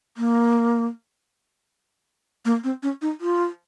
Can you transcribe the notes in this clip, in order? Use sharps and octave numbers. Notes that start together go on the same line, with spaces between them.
A#3
A#3
C4
C#4
D#4
F4